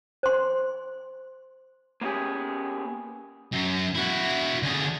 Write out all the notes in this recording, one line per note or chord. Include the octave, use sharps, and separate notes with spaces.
C5 C6
A#3 B3 C#4 G4 G#4
F#2
E4 F#4
D3 G#4